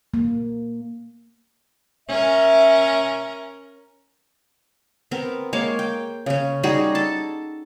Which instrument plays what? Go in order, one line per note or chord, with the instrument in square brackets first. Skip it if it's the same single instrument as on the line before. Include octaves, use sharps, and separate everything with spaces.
[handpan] A#3
[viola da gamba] C#4 A#4 [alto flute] E5
[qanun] B3 C4 A#4
G#3 A#3 C#5 F5
G5
C#3 C#4
G3 D#4 F#4 G#4
A4 A5